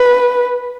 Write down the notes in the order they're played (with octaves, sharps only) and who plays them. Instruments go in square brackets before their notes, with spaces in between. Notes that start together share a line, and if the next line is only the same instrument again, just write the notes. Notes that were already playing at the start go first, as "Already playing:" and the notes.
Already playing: [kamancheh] B4